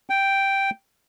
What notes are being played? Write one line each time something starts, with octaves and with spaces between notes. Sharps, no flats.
G5